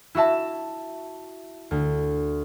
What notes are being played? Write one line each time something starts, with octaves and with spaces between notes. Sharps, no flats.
E4 F#4 E5 A5
D2